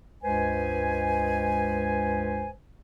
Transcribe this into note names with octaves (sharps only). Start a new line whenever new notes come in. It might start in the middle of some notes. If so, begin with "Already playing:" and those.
C#2 G2 G#3 B4 C5 G#5